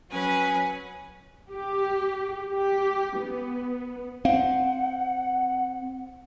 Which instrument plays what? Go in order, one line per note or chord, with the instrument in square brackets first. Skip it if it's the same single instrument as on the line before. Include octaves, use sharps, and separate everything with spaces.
[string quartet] F#3 C#4 B4 G#5 D#6
[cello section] G4
G4
B3
[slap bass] C4 [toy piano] F5 [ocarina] F#5